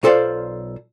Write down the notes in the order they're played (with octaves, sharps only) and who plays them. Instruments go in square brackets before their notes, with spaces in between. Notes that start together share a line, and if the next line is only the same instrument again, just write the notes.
[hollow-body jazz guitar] B1 F4 A4 C5 D5 F5